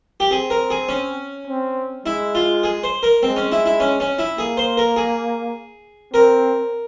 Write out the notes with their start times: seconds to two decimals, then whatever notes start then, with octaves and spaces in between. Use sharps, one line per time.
0.20 G4
0.31 C4 G#4
0.50 A#4
0.70 G#4
0.89 C#4
1.47 C4
2.06 G#3 E4
2.35 F4
2.63 G#4
2.84 C5
3.03 A#4
3.22 G#3 C4
3.36 C#4
3.52 E4
3.66 E4
3.80 C#4
4.00 C#4
4.19 E4
4.38 A#3 G#4
4.57 C5
4.77 A#4
4.96 G#4
6.13 C4 A#4